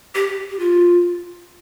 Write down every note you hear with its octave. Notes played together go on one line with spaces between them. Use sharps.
G4
G4
F4